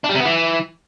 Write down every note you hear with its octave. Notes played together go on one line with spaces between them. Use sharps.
D4
G3
C3
B3
E3